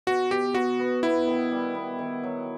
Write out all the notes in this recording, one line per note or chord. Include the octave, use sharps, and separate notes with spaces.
B2 F#4
B2 G4
B3 F#4
B3
B3 E4
D#3
G3
B3
D#3
F#3